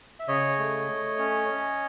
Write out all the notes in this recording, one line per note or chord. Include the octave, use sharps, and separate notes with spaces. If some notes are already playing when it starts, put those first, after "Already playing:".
E5
C#3 C#5 D#5
A3
A3
C#4
C#4